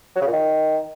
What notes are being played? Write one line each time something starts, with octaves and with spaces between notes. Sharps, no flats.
F#3
C#3
A#2
D#3